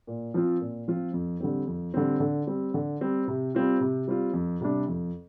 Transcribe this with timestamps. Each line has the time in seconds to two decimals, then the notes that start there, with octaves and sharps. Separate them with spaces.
0.07 A#2
0.34 F3 C4 F4
0.61 A#2
0.88 F3 C4 F4
1.13 F2
1.40 D3 G3 C4
1.67 F2
1.94 D3 G3 C4
2.20 D3
2.47 G3 C4
2.74 D3
3.01 G3 C4
3.28 C3
3.55 G3 C4 F4
3.81 C3
4.08 G3 C4 F4
4.33 F2
4.61 C3 G3 D4
4.88 F2